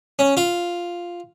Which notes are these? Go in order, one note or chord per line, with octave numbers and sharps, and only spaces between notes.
C#4
F4